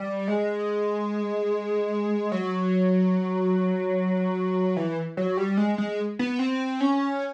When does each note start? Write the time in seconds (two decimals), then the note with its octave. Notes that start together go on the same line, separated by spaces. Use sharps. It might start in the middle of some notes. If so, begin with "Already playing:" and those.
Already playing: G3
0.28 G#3
2.32 F#3
4.77 E3
5.17 F#3
5.37 G3
5.57 G#3
5.78 G#3
6.19 B3
6.39 C4
6.81 C#4